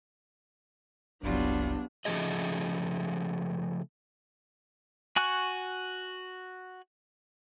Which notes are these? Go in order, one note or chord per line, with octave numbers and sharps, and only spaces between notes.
F#1 C2 F#3 G3 B3 D4 F4
C#3 F3 A3 G#4 D#5
F#4 G#5 C#6 F#6